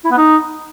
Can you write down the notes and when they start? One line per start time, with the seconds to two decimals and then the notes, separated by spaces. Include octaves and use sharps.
0.05 E4
0.11 B3
0.18 D#4